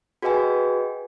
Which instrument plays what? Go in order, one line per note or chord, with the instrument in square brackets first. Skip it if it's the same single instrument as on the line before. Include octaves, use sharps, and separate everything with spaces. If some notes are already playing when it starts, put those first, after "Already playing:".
[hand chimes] F#4 G#4 B4 D#5 G5 G#5